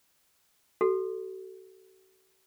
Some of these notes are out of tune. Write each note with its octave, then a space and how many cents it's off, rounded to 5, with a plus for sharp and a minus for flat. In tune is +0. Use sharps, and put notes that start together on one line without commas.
F#4 +40 A4 +0